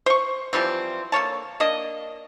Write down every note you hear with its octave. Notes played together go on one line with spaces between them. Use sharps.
C5 C#6
E3 F3 G3 C4
D3 A#3 C#5 A5
A#3 D4 D#5